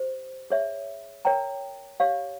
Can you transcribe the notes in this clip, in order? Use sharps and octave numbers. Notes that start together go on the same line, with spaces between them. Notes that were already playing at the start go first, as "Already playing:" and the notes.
Already playing: G4 C5
G#4 C#5 E5
A#4 C#5 G5 A#5
G4 C#5 F5